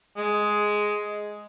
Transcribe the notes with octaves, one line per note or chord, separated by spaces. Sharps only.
G#3